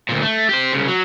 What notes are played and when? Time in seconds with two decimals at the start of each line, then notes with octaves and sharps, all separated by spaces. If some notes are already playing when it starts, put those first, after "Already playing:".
0.09 D2 A#2
0.22 A3
0.49 G4 C5
0.73 C2 C#3
0.88 F#3